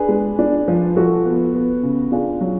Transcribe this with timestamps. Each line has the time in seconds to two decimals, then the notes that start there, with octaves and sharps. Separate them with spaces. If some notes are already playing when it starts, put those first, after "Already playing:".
Already playing: D4 G#4 B4
0.09 G#3
0.39 D4
0.68 F3
0.96 F3 F#4 A4
1.25 B3
1.55 B3
1.83 C#3
2.12 D4 F4 G#4
2.41 F#3